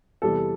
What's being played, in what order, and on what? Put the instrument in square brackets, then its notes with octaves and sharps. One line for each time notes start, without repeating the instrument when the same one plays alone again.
[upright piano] E2 C3 E3 G3 A4